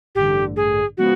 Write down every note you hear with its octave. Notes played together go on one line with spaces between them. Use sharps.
A1 G2 D3 G4
G#4
C#3 F3 G#3 B3 F#4